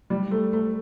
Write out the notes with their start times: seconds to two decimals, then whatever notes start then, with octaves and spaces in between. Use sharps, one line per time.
0.10 G3
0.31 A3
0.53 A3